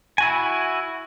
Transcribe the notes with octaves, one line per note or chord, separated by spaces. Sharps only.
E4 F#4 G#5